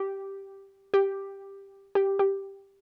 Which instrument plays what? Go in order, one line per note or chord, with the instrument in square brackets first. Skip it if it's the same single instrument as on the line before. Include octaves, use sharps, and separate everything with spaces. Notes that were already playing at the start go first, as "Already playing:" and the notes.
Already playing: [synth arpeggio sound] G4
G4
G4
G4